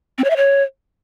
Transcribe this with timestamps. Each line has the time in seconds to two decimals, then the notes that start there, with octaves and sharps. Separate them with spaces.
0.18 C4
0.24 C#5
0.30 E5
0.36 C#5